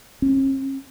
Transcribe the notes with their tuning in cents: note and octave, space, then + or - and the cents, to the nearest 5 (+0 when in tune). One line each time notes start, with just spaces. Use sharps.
C#4 -45